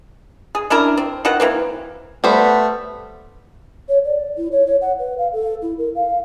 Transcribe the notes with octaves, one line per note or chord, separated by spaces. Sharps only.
G#4
C#4 D4 E4 A#4
C4
D#3 E3 F#4 F#5
E3 A#3 C4
G3 A3 B3 C5
C#5
D5
E4
C#5
C#5
F#5
B4
F5
A4
E4
A#4
F5